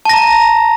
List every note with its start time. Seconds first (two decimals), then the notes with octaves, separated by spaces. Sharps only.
0.05 A5
0.09 A#6
0.13 A#5